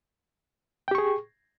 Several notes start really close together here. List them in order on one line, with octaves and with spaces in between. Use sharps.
G5 G4 C#6 G#4